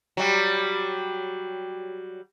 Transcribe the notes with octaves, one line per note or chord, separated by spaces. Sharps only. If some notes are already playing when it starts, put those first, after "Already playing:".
F#3 G3